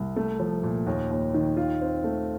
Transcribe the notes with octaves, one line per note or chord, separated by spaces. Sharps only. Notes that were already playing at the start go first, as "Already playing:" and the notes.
Already playing: C2
A3
F3
A#2
D#2
D#2
D#3
F4
C4
A3